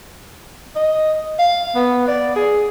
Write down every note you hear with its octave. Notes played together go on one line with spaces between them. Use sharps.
D#5
F5
B3
D5
G#4